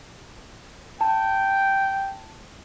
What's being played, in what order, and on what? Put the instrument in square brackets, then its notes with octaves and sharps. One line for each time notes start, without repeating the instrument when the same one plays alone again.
[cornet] G5 [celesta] A5